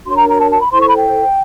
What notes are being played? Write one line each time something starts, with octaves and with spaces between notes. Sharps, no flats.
D4 F#4 A#4 C#5 C6
A#5
A#5
A5
A5
B5
E4 A4 C5 C6
C#6
B5
G5